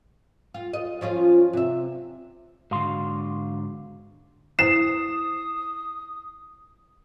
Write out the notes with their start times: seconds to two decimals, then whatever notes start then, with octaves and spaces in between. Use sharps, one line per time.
0.54 F4
0.73 D#5
1.01 F3 C#4 F4
1.53 C3 E5
2.71 G#2 D3 F#4 F5 C6
4.59 E4 C5 D#6 C7 E7